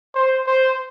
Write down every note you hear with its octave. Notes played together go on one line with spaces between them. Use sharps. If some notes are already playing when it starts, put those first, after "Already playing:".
C5
C5